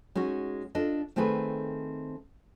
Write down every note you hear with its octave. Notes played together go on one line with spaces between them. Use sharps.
G#3 C#4 D#4 F#4
D4 F4 A4 D#5
D#3 A3 C4 G#4 A4 B4